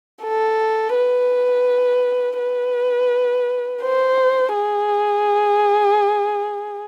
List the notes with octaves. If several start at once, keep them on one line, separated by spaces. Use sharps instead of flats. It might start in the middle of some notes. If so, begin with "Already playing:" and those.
A4
B4
B4
C5
G#4